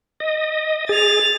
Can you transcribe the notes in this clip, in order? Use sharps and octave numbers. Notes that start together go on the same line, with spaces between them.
D#5
G#4 A6 F7